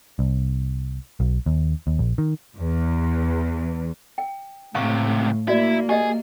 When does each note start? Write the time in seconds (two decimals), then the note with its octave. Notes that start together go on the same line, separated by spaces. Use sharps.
0.19 C2
1.20 B1
1.46 D#2
1.87 D#2
1.99 A#1
2.18 D#3
2.58 E2
4.18 G5
4.75 C#2 A2 C3 F5 C#6
5.48 A#3 E4 F#4 D5
5.89 G4 G#4 D#5 E5